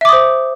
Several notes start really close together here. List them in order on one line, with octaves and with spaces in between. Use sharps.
E5 D6 D#6 C5